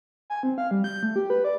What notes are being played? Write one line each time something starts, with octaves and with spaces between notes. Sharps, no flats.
G#5
C4
F5
G3
G6
A3
G4
B4
D5